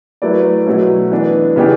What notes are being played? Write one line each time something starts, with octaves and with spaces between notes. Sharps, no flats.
F#3 A3 E4 B4 D5
B2 F#3 A3 C#4
E3 B3 D4
C#3 E3 B3 D4 G4